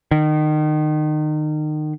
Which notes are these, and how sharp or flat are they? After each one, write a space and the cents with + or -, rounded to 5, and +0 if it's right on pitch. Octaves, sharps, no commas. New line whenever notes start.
D#3 -30